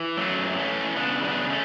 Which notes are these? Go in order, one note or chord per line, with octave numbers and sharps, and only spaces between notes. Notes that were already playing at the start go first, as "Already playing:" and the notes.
Already playing: E3
F#2 F#3 A3
E3
A3 C#4
E3
C#3 B3 D4
F#2 B3 D4
A3 C#4